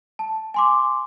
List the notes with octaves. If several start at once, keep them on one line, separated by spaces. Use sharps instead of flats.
A5
G#5 C6 D6